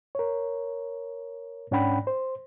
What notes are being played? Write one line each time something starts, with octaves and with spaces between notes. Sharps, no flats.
A#4 C#5
G#2 C#4 D4 F#5 G5 B5
C5